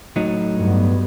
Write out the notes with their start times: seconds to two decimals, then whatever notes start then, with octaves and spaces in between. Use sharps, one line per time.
0.16 A2 F#3 D#4
0.55 G2 B3